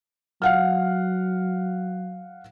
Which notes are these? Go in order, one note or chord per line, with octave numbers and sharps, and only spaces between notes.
F#3 F5 F#5 F6